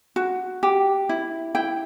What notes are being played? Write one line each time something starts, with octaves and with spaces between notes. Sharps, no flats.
F#4
G4
E4
E4 G5